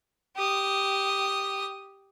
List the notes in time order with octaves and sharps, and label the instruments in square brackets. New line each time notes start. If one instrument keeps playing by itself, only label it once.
[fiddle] G4 D#6